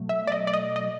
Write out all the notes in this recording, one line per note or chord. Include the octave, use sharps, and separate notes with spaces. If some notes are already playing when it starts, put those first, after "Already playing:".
Already playing: B2 F#3 A3
E5
D5
D#5
D5
D#5
D#5